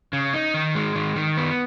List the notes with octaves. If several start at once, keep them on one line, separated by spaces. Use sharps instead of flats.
C#3
D#4
D#3
G#3
D#3
D#3
B3